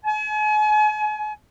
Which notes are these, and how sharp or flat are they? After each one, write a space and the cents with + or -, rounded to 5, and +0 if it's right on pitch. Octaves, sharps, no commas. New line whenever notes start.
G#5 +40